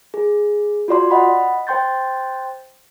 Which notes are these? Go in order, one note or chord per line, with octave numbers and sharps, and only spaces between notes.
G#4
F4 F#4 D5 C6
D#5 F#5 B5
C5 G5 C6 G6 A6